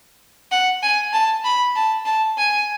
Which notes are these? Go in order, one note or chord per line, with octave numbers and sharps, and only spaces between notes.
F#5
G#5
A5
B5
A5
A5
G#5